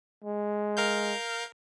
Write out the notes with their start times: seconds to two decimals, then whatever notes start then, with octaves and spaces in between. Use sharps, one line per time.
0.24 G#3
0.77 A#4 F5 G6